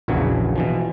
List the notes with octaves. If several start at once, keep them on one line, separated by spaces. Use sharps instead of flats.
A#1 E2 A#2 C#3 E3 F#3
B2 E3 F3